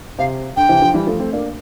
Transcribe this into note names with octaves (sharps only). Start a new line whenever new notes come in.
C3 F5
D3 G5
C3 E3
D3 F3
E3 G3
F3 A3
A3 C4
A#3 D4